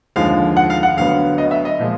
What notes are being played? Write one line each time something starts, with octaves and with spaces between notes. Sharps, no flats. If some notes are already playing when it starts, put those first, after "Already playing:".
D#2 D3 F3 G#3 F5
F#5
F5
F#5
D2 D3 F#3 B3 F5
D#5
E5
D#5
A#2 F3 G#3